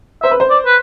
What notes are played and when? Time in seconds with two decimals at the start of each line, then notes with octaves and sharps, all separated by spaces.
0.23 C5 E5
0.31 B4
0.40 C5
0.50 D5
0.66 B4